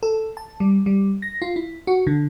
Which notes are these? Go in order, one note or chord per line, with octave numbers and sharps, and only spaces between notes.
A4
A5
G3
G3
A#6
F4
E4
F#4
D3